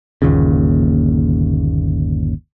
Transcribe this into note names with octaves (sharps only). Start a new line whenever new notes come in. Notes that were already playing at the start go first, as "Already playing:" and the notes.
G1 D#2 A#2 C#3